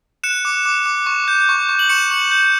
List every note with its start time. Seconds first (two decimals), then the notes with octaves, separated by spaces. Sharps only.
0.24 F#6 C#7 E7
0.45 D6
0.66 D6
0.86 D6
1.06 C#6
1.28 G6
1.49 C#6
1.69 C#6
1.79 F#7
1.89 C#6 C#7 E7
2.11 C#6
2.31 G6